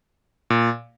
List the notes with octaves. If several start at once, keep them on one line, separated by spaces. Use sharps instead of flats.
A#2